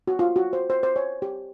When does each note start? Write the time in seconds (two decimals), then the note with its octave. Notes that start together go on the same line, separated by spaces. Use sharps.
0.07 F#4
0.19 F4
0.36 F#4
0.53 C5
0.70 C5
0.83 C5
0.96 C#5
1.22 G4